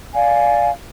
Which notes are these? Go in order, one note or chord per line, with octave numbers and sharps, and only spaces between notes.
D5 F5 G#5